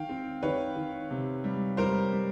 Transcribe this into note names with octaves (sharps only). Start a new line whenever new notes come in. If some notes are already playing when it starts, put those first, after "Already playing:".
Already playing: D#3 F5 G5
C4
D#3 B4 C#5
D#3
C3
G3
G3 A#4 C5
G3